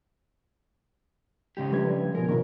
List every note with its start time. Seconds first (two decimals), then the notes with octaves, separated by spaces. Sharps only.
1.57 C#3 G#3 G4
1.72 F3 G3 A3 D4 B4 G#6
2.15 B2 F3 G#4 A#4
2.29 C3 D#3 F3 A#3 D4